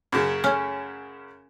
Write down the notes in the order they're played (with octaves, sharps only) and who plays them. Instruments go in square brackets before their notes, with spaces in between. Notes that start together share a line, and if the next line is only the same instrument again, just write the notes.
[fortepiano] F#2 C#3
[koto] C#4